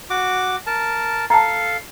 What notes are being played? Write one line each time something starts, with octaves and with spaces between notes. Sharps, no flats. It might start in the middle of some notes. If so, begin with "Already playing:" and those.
F#4 D6
A#4 A5
A4 F5 A5 A#5